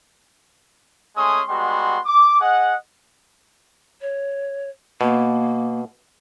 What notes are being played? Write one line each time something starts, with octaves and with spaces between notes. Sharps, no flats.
G#3 A3 C#4 C6 D#6
G3 G#3 B3 F#4 C6
D6
G#4 D#5 F#5
C#5
B2 A#3